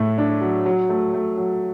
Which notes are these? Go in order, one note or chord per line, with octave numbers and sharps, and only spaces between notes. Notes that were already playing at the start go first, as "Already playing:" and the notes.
Already playing: A2 A3
D4
F#3
F#3
A3
A3
F#3